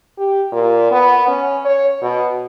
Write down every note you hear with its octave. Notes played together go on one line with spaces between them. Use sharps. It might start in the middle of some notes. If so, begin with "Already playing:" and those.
G4
A#2
B3
C#4
C#5
B2